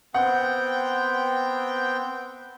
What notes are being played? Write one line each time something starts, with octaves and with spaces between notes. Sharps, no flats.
B3 C4 F#5 G5